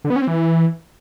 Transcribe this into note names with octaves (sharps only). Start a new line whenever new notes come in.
D3
B3
C#4
C4
E3